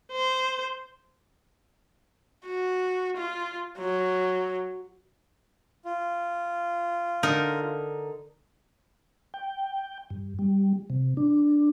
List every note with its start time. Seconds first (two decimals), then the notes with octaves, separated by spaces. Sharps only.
0.12 C5
2.46 F#4
3.17 F4
3.79 F#3
5.84 F4
7.23 D3 D#4 A#4
9.34 G5
10.10 G2
10.39 G3
10.90 C3
11.17 D4